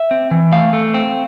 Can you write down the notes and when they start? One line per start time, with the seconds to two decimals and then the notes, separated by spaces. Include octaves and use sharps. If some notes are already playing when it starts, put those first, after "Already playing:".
Already playing: E5
0.11 C4
0.31 E3
0.52 A3 F5
0.73 A3
0.94 C4